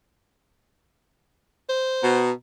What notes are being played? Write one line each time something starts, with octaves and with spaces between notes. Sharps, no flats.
C5
B2 B3 A#5